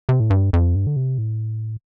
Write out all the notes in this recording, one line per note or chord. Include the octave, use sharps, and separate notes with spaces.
C3
A2
G2
F2
G2
D3
C3
A2